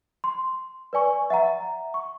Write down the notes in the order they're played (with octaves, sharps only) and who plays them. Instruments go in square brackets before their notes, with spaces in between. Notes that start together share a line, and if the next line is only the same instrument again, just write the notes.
[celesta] C6
B4 D5 G#5 C#6
E5 F#5 A#5
C#6